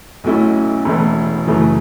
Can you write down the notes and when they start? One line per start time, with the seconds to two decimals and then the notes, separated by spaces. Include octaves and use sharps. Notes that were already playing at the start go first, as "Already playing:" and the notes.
0.24 B1 B2 A3 C#4 E4
0.85 E1 E2 E3 A3 E4
1.47 F#2 C#3 E3 A3